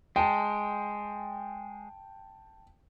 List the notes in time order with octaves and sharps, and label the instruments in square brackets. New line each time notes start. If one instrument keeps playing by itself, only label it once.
[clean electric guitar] G#3 [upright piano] G5 A5